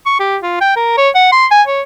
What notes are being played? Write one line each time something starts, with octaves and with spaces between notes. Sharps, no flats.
C#6
G4
F4
G5
A#4
C#5
F#5
C6
G#5
C#5